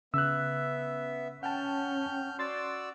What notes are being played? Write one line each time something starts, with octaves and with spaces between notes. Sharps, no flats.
C#3 B3 E5 E6 F#6
C#4 F#5 G5 A5 F6 G6
F#4 D5 C6 E6 A6